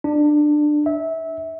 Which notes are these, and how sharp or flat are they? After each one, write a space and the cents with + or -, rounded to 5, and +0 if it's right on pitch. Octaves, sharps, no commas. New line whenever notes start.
D4 +20
E5 -20